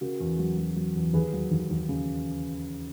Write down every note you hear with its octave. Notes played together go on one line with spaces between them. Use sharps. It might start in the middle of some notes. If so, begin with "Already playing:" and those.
C#3 F#4 A#4
E2
F#3
F#3
F#3
E2
D#2 G#4 B4
F#3
D#2
D#2
C#3